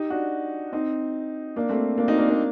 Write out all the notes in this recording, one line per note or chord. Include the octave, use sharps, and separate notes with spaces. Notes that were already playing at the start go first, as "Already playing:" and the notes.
Already playing: D#4 G4
D4 F#4
C4 D#4
A#3 D4
A3 C4
A#3 D4
C4 D#4
A#3 D4
A#3 D4